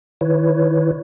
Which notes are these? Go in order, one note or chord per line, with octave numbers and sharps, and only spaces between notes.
D#3 E4 B4 C#5